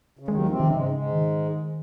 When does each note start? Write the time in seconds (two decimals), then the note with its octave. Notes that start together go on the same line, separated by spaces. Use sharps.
0.19 C#3
0.28 D#2 D#3 G#3
0.39 F#3
0.49 C3 F3 C4
0.60 D#3
0.70 G#2 C#3 G#3
0.91 G#2 G#3
1.12 D#3